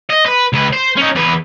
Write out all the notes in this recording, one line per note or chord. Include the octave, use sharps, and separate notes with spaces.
D#5
B4
C#2 B4
C5
C#4 D#4
E2 B4